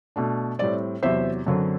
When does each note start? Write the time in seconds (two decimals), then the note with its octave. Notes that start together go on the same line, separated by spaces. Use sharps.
0.16 B2 A3 D4
0.59 A2 G3 C4 D5
1.03 E2 C3 F#3 C5 E5
1.47 F#2 D3 F#3 C4